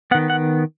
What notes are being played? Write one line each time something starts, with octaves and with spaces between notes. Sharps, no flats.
D#3 B3 F#5
F#5